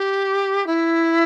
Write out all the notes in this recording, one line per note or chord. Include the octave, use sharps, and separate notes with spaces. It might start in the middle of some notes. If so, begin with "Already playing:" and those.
Already playing: G4
E4